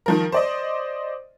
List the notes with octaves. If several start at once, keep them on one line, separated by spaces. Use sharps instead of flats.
D#3 F3 A#4
C5 D5 D#5